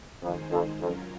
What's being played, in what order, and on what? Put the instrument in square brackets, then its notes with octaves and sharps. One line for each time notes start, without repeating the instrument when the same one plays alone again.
[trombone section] F2 [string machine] D#3 G#3 D#4 G#4 C5
[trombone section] F2
[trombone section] F2 [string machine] F#3 C#4 F4 A#4